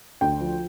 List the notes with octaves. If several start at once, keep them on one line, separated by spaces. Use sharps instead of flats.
D2 G5
F3